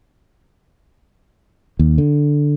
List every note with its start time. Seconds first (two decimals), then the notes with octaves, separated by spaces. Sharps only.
1.79 D#2
1.98 D3